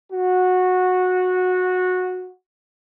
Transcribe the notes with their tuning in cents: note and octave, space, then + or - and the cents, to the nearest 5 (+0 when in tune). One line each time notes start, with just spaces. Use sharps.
F#4 -15